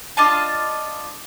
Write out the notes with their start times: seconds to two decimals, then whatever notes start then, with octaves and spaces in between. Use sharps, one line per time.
0.17 D4 F4 D#5 A5